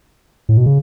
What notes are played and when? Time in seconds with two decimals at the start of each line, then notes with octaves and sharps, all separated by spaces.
0.49 A2
0.57 B2
0.66 C#3